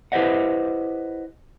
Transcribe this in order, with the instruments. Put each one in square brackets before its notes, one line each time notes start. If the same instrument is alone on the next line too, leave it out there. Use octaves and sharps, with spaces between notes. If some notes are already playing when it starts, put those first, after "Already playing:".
[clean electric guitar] E4 G4 B4 C5 D#5 F#5